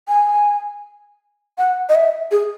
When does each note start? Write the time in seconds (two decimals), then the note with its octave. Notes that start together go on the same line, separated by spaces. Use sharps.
0.08 G#5
1.58 F#5
1.89 D#5
1.95 E5
2.31 G#4